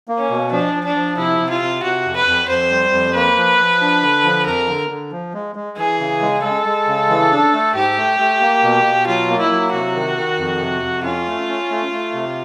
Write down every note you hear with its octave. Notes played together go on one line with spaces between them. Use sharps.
A#3
C#4
B2
F3 D4
F3
D4
F3
C3 E4
C3
F4
C3
C3 F#4
F2
B4
F2
F2 C5
G3
F2
A#3 B4
F3
F3
D4
D3
F3
F2 A#4
D3
D3
F3
G#3
G#3
E3 G#4
C#3
G#3
G#3 A4
G#3
C#3
E3
D4
A3
G#2 G4
A3
A3
A#3
B2
B2
F#3 F4
A#3
E4
F#3
C3 F#4
D#3
D#3
F2
C3
F2
C#4 F4
A3
C#4
A3
A3
C3